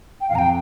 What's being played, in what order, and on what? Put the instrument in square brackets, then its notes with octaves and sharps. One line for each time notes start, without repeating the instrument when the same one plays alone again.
[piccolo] G5
[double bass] F2 [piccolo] F5
[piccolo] A#5
G5